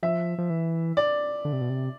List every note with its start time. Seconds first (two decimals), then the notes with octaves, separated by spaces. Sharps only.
0.03 F3 E5
0.38 F3
0.50 E3
0.97 D5
1.45 D3
1.53 C3
1.61 B2
1.69 C3